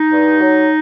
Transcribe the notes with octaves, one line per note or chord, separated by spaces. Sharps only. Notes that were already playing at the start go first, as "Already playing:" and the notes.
Already playing: D#4
G2
F#3